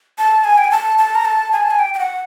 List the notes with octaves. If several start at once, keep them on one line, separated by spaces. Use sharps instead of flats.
A5
G#5
G5
G#5
A5
A5
A#5
A5
G#5
A5
G#5
G5
G5
F#5